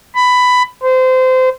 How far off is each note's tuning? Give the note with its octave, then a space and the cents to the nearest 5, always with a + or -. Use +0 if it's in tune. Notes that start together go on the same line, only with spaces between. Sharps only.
B5 +15
C5 -25